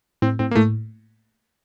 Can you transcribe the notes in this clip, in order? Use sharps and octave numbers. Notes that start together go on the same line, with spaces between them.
A2 C4
A2 C4
A#3
A2 A3